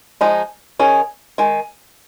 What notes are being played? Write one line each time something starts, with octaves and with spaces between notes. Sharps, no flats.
F3 G#3 D#4
D#3 C#4 G#4
D#3 G#3